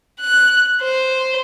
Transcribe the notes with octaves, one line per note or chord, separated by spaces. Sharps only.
F#6
C5